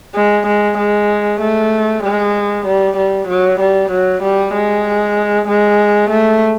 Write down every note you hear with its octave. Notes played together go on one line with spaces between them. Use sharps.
G#3
G#3
G#3
A3
G#3
G3
G3
F#3
G3
F#3
G3
G#3
G#3
A3